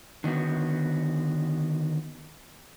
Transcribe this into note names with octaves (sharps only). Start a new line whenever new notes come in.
D3 D#3 B3 F#4